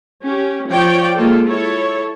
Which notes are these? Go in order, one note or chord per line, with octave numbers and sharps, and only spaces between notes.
C#4 G4
F3 C#5 D5 G5
G#3 A#3 F4 A4
E4 A4 C#5